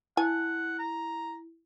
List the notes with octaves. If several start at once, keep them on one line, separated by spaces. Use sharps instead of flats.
E4 F#5 G#5
A#5